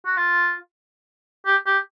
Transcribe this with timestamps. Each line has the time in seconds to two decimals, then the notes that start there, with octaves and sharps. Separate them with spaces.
0.06 F#4
0.17 F4
1.46 G4
1.66 G4